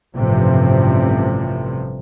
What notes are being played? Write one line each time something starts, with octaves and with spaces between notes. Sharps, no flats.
A1 G2 C3 F3